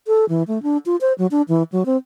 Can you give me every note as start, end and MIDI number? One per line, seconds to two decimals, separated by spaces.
0.07 0.25 69
0.29 0.43 52
0.48 0.61 57
0.63 0.77 62
0.86 0.96 65
1.01 1.13 72
1.18 1.27 54
1.31 1.42 62
1.48 1.63 52
1.72 1.84 54
1.86 1.97 60